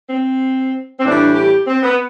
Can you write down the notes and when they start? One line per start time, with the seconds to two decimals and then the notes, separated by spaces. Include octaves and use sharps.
0.09 C4
0.99 C4
1.04 A2 E3 G3 D4
1.35 G4
1.67 C4
1.83 B3